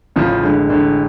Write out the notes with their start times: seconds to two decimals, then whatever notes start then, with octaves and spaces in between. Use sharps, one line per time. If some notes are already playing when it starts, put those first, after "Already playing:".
0.16 A1 C#3 F3
0.42 D3 G#3
0.69 A1 D3